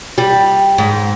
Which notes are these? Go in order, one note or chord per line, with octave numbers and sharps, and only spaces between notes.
G3
G#2